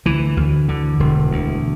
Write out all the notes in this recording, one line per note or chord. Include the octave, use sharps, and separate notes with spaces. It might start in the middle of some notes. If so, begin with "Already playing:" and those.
D2 E3
D2
D3
E1
D2